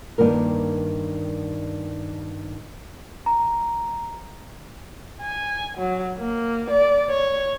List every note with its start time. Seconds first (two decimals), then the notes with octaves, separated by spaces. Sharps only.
0.18 G2 D#3 A#3 A#4
3.26 A#5
5.22 G#5
5.77 F#3
6.18 A#3
6.71 D5
7.09 C#5